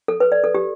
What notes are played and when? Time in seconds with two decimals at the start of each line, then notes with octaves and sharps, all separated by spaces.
0.08 A4
0.20 B4
0.32 D5
0.44 A4
0.55 G4